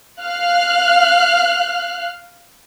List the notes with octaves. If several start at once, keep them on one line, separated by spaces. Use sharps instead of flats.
F5 F6 F#6